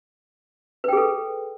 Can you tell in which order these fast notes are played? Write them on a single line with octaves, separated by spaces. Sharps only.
B4 G5 G#4 A4